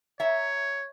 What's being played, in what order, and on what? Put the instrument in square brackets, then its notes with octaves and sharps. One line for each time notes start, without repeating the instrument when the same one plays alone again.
[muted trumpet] C#5 [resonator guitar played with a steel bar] E5 A#5